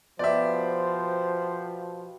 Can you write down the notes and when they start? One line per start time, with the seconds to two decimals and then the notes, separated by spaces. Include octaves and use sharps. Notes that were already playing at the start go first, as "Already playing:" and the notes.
0.19 B2 F3 G4 C5 D5 E5